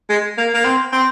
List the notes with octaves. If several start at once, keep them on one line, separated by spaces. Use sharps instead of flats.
G#3
A#3
A#3
C4
C4